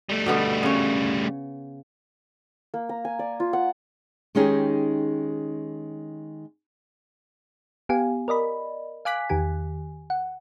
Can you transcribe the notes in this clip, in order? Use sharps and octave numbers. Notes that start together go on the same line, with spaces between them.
G3 A3
B2 D3 B3
C#3 C#5
A#3
A#5
G#5
D5
F4
F#5
D#3 G#3 C#4 D#4 G4 G#4
B3 G4 F5 G#5
A#4 D5 D#5 B5
F5 G#5 D6 F#6 B6
E2 D#3 G4 G#5
F#5